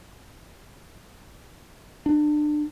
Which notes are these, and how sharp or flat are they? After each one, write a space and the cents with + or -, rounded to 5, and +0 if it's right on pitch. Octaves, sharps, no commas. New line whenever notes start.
D4 +30